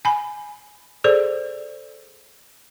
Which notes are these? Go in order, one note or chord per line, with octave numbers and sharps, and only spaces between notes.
G#5 B5
G#4 A4 C5 D5